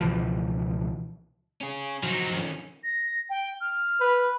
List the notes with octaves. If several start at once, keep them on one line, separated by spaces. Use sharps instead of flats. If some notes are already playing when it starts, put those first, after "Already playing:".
C#2 B2 E3 F3
C#4 G#4
F3 F#3 D#4
D#3 C#4
A#6
G5
F6
B4